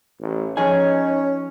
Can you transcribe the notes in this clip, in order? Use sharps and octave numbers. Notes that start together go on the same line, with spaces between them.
A1
F3 C#4 D#4 G#4 C#5 G#5